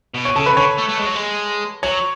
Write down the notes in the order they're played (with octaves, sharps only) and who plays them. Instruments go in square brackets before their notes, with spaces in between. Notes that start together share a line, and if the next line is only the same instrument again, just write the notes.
[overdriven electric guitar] B2
[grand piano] C#5 C#6
[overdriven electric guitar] C#3 [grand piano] A4 A5
[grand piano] B4 B5
[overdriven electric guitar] D3 [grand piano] C#5 C#6
[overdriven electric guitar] A3
A3
G#3
F#3
G#3
[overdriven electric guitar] F#3 [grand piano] C#5 C#6